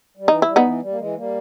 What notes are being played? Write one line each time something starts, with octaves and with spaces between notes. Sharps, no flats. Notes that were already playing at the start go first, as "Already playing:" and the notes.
G3
E3 D#4
G3 E4
B3 D#4
E3
G3
A#3
E3 G#3
G3 A#3